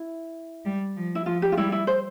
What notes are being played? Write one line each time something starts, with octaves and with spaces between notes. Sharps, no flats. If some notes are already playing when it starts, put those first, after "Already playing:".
Already playing: E4
G3
F3
E4
F3 F4
G4
F4
G3 E4
E4
C5